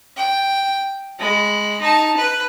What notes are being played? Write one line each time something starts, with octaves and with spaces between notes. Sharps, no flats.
G5
G#3 B5
D#4 A5
B4